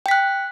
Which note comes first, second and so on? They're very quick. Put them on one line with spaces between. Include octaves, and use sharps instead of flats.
G5 B6 F#6